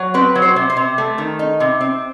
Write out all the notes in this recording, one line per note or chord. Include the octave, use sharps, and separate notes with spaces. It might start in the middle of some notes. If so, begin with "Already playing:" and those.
Already playing: F#3
C4 B4
F#3
C5
C3
C5
C3
A3
D#3
D#4
C3
C4